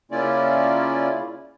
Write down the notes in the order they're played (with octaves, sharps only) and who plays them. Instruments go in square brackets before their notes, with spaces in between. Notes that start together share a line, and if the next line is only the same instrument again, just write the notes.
[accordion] C#3 A#3 C#4 E4 F4 D5